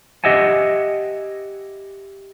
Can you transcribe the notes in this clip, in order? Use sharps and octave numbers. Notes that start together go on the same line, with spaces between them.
G4 D#5 E5 F#5 G#5